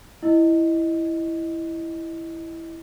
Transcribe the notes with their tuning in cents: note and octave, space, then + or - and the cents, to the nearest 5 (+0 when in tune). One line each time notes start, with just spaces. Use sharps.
E4 +0 D#5 +0